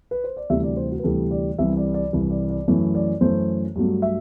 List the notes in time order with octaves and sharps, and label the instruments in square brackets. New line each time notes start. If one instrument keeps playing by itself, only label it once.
[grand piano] B4
C5
D5
D2 C3 E3 G3 E5
D5
C5
F#4
B4
D2 C3 E3 G3 A4
D5
C2 C3 E3 E5
D5
D5
C2 C3 E3
D5
D5
F#2 E3 A3
D5
F#2 E3 A3 C5
G2 F#3 A3
E5